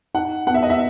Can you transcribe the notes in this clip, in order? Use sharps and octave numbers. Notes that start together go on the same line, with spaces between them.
D#4 F#5
B3 F#5
E5
D#5
E5